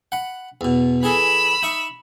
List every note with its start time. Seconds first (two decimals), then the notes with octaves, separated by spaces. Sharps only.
0.12 F#5 B5
0.61 E2 B2
1.03 E3 G#4 A4 B5 E6
1.63 D#4 E5 C#6